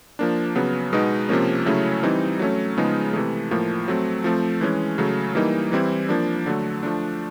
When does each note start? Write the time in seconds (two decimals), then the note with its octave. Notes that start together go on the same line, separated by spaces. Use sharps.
0.19 F3 A#3 D4
0.55 C#3 F#3 B3
0.93 B2 G#3 B3 D#4
1.29 C3 F3 A#3 C#4
1.66 C#3 F#3 A3 C#4 E4
2.03 E3 G3 C4 D#4
2.39 F#3 A3 C#4
2.77 C#3 F3 G#3 B3 D#4
3.13 C3 E3 A3
3.51 A2 F3 A#3
3.88 F#3 A3 C4
4.24 F3 A3 C4
4.61 E3 G#3 C#4
4.98 C#3 F#3 A3
5.35 E3 G3 A#3 D#4
5.72 E3 G3 C4 E4
6.09 F3 A#3 D4
6.46 D3 F#3 A3
6.83 F3 A3 D4